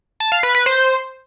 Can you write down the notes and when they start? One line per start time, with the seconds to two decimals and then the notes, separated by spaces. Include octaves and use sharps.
0.20 A5
0.32 F5
0.43 B4
0.55 B4
0.66 C5